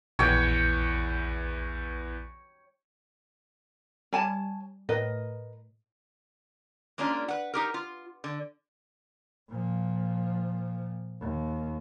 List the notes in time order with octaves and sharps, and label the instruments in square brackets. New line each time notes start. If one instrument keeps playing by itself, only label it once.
[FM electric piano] A#1 G6 [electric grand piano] E2 E3 [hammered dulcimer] C#5 G5
[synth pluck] G3 [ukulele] C#5 G#5 A5
[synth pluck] A2 [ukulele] A#4 B4 D#5
[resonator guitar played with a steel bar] G#3 A#3 C#4 D4 F4
B4 F#5
D#4 G4 A#4
F4
D3
[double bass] A#2 F3
D#2